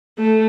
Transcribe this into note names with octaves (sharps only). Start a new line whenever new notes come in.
A3